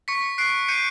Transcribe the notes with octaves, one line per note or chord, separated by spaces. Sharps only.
C#6 B6 C#7
F#6 C7 D7
G6 C#7 D#7